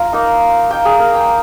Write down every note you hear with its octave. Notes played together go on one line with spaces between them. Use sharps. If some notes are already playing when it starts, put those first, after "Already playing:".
Already playing: F4 A#5
A#3 D#4
A#3 D#4 G5
G#4
A#4
G5